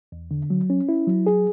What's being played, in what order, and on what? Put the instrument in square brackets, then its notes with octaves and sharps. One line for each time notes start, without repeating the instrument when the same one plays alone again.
[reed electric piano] E2
D3
F#3
C#4
E4
F#3
G#4